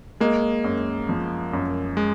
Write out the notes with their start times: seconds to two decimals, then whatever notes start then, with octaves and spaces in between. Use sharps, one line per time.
0.21 G#3 A#3
0.64 F#2
1.09 F3
1.53 F#2
1.97 G#3